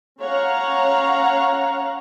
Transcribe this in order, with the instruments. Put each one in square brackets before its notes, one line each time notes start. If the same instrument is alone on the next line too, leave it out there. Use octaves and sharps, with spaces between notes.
[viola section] C#4 C#5 F5 F#5 A#5